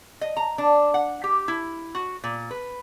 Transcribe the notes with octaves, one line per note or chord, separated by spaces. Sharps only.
D#5
A#5
D4
F#5
G4
E4
F#4
A#2
B4